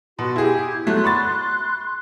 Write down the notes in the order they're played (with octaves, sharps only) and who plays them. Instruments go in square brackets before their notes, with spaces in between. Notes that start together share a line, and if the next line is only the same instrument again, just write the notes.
[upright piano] B2 [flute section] F#4 C6
[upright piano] E4 G#4 [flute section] G4 G#6
[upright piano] F#3 A3 [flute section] C6 F#6
[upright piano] B5 C#6 A6